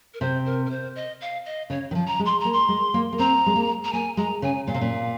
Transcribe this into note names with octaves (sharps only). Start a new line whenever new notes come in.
A#4
C3 C5
A#4
A#4
C5
D#5
F5
D#5
C#3 C#5
D#3
F3
A#5
G#3
C6
A#5
A#3
C6
G#3
A#3
A#3
C4 A#5
G#3
A#3
A#5
A#3 G#5
G#3 A#5
C#3 G#5
A#2 F5
C3
A#2